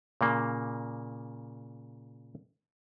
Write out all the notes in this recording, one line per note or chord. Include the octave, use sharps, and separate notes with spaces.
A#2 C#3 A#3